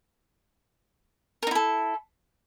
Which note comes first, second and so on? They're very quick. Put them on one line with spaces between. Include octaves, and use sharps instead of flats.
A#4 D#4 E4 A4